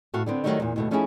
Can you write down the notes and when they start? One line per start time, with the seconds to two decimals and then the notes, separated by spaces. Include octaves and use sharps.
0.14 A2 A3 F#4 F5
0.26 D3 B3 C4 D4
0.44 D#3 E3 F#3 G3 A3 D#4
0.60 E2 A#2
0.76 D#2 B2 A3
0.91 F3 A3 C#4 D#4 E4 G#4